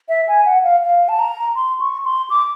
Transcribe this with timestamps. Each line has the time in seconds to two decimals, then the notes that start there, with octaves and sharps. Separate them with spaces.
0.09 E5
0.28 G#5
0.46 F#5
0.64 F5
0.83 F5
1.09 A5
1.19 A#5
1.56 C6
1.80 C#6
2.05 C6
2.30 D6